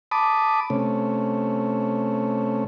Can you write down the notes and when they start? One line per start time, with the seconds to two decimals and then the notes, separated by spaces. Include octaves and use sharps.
0.12 A5 B5 D6 D#6
0.70 C3 A3 C#4